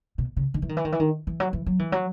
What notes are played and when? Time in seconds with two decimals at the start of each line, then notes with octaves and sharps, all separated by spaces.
0.18 B2
0.37 C#3
0.54 D#3
0.62 E3
0.69 D#3
0.77 E3
0.85 D#3
0.92 E3
1.00 D#3
1.27 E3
1.40 F#3
1.53 E3
1.66 F#3
1.79 E3
1.92 F#3